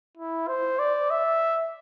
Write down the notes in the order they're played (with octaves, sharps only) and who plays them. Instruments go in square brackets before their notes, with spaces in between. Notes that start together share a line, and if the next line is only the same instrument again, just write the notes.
[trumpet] E4
C5
D5
E5